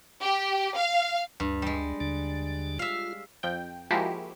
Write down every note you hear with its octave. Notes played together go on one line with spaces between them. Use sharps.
G4
F5
D2 G2
G3 G#3
D#2 D3 D4
F4 E5 F5
F2 G5
F3 G#3 A#3 E4 F#4 G4